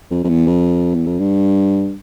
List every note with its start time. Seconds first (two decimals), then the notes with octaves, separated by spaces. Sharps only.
0.11 F2
0.24 F2
0.29 E2
0.47 F2
0.94 E2
1.07 F2
1.19 G2